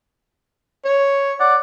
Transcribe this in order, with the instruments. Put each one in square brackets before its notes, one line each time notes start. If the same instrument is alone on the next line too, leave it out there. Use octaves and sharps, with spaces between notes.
[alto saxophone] C#5
[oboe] D5 [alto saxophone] F#5